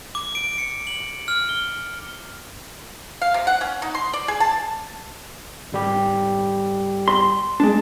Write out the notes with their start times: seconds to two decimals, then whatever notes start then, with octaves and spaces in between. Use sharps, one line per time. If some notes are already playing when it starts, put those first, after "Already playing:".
0.15 D6
0.35 D7
0.58 C#7
0.87 F#7
1.28 F6
1.49 G7
3.22 F5
3.34 C3
3.47 F#5
3.61 C#4
3.82 D#4
3.95 C6
4.13 D5
4.28 G#4
4.40 A5
5.72 G#1 G3 G4
7.08 C6
7.60 G#3 D4 A5